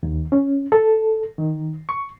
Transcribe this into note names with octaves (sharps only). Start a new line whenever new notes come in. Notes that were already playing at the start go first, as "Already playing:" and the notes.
D#2
C#4
A4
D#3
C#6